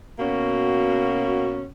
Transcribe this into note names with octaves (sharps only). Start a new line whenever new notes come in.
B2 A#3 C#4 F#4